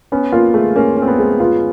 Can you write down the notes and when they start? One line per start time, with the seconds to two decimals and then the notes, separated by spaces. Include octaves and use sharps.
0.12 B3 C#4
0.32 A#3 F4
0.54 G#3 A3
0.76 A#3 C#4
0.96 C#4
1.02 C4
1.07 B3
1.19 G#3
1.40 B3 F4